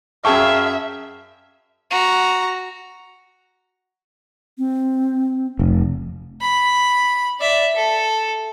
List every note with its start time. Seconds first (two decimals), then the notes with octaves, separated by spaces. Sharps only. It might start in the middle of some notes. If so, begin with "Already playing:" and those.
0.25 F#2 G#4 E5 F5 G5 A5 C#6
1.91 F#4 A#5
4.58 C4
5.59 F1
6.41 B5
7.40 D5 E5
7.75 A4